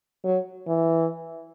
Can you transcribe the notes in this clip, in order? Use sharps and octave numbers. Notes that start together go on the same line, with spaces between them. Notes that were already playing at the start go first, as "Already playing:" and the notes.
F#3
E3